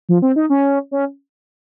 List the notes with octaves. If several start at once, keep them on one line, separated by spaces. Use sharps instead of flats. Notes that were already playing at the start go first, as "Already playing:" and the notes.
F3
C4
D#4
C#4
C#4